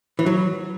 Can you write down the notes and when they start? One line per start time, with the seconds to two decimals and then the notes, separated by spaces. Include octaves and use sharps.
0.19 E3
0.26 F#3